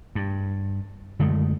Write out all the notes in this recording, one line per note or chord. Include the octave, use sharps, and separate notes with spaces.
G2
F#2 D3 G#3 A3